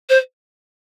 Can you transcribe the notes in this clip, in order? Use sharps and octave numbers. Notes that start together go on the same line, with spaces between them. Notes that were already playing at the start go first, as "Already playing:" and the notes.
C5